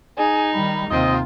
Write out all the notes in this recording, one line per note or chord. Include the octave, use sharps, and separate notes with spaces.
D#4 G#4
D#3 G3 B5
D#2 C3 C4 F4 D#5